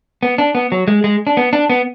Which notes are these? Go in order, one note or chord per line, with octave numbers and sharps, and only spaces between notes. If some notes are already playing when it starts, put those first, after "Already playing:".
B3
D4
B3
F#3
G#3
G#3
D4
B3
D4
B3